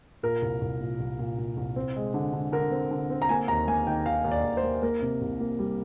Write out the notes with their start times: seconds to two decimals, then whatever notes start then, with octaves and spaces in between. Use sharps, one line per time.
0.23 A#2 A#4
0.42 C2
0.61 C2
0.80 A#2
1.00 C2
1.19 A#2
1.38 A#2
1.57 C2
1.76 C4
1.96 G#3
2.14 D3
2.33 D3
2.52 D3 A#4
2.71 C4
2.91 D3
3.10 C4
3.22 A#5
3.29 A#3 G#5
3.48 D#2 A#5
3.67 A#3 G#5
3.87 D#3 G5
4.06 D#2 F5
4.24 D#2
4.32 D5
4.44 D#2
4.57 C5
4.63 A#3
4.82 A#3 A#4
5.02 C3
5.21 C2
5.40 A#3
5.59 G3